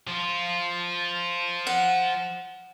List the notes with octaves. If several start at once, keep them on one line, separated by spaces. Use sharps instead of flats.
F3 F4
F#5